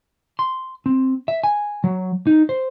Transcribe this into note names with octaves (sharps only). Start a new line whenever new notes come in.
C6
C4
E5
G#5
F#3
D#4
C5